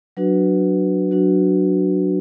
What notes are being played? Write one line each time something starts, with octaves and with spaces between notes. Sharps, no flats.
F#3 D4 F#4 B4
F#3 D4 F#4